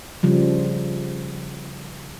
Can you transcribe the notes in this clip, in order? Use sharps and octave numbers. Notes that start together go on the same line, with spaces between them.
C#3 F3 G3